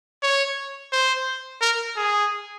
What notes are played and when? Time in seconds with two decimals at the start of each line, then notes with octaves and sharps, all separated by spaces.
0.23 C#5
0.92 C5
1.61 A#4
1.96 G#4